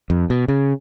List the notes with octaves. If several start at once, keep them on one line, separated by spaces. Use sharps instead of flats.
F2
B2
C#3